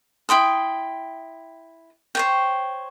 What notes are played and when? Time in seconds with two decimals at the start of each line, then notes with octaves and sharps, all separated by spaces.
0.29 E4 G5 C6 D#6
2.15 C5 C#5 G5